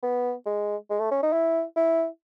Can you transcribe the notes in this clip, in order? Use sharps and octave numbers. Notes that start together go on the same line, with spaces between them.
B3
G#3
G#3
A3
C#4
D#4
E4
E4